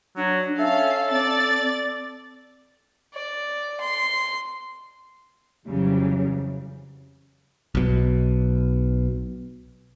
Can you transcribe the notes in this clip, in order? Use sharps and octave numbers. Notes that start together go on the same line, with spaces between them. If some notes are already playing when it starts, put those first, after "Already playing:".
F#3 D4
C#4 A4 E5 F5
C4 D5 A6
D5
C6
F2 C#3 E3 F#3 G3
B1 B2